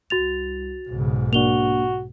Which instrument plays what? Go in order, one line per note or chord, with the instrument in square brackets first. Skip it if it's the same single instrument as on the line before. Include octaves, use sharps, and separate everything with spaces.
[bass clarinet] C2 [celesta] F#4 A6 F7
[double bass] B1 G#2 [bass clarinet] C#3
[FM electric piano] A#3 D4 [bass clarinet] F#4 [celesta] F7 G7